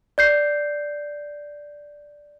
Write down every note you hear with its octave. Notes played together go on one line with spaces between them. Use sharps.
D5 G6 C7